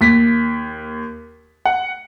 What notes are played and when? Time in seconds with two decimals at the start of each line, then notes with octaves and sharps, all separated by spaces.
0.01 D#2 B6
1.65 F#5